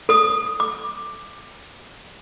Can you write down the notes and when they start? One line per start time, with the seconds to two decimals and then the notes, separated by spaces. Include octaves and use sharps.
0.09 A4 D#6
0.60 D6